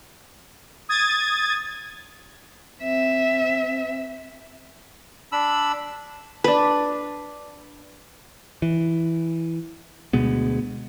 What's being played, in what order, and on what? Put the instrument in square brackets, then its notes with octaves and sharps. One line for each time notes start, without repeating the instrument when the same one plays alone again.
[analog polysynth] D#6 G#6 A6
[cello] C4 E5
[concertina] D4 B5 E6
[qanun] D4 B4
[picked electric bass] E3
D2 B2 G#3 B3